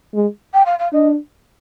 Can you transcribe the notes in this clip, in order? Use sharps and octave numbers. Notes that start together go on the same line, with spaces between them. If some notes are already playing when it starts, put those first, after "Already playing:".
G#3
G5
F5
F5
D4 D#5